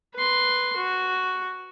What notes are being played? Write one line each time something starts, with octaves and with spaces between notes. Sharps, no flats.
B4 C6
F#4